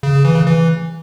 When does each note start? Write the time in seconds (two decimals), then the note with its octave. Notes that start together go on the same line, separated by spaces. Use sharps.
0.03 C#3
0.14 C#3
0.25 E3
0.36 C#3
0.46 E3